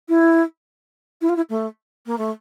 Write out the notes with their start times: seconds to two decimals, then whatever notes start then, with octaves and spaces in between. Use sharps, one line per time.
0.09 E4
1.21 E4
1.29 F4
1.36 E4
1.49 A3
2.06 A#3
2.18 A3